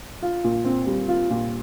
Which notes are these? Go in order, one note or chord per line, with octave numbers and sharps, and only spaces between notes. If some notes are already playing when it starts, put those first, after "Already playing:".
F4
A#2
C4
G3
F4
A#2